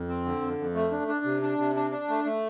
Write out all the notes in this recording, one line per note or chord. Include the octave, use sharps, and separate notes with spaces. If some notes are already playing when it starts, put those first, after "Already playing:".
Already playing: F2
C4
D3
F2
F2
A3
D4
D4
C3
D4
C3
D4
D4
A3
A3